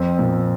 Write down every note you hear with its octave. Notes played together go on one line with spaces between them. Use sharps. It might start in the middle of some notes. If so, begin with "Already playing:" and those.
Already playing: F2 C4
A#2